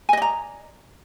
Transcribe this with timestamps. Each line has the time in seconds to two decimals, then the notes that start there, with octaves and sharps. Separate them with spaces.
0.09 G#5
0.13 D#5
0.17 D5
0.22 A#5